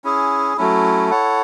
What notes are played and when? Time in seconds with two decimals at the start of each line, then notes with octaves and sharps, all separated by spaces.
0.04 C#4 E4 G#4
0.57 F#3 A3 C#4 E4
1.10 E4 A4 C#5 F#5